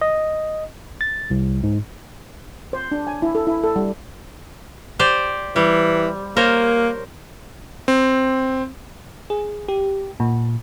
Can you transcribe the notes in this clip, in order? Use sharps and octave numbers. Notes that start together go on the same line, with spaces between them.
D#5
A6
C2
G#2
C5
D4
G#5
E4
A4
E4
A4
G3
G4 C5 D5
E3 G3
A#3 A#4 C5 C#5
C4
G#4
G4
A#2